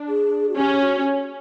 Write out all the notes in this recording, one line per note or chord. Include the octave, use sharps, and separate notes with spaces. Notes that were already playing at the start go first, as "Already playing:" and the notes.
Already playing: D4
G#4
F#4
C#4 G4
F#4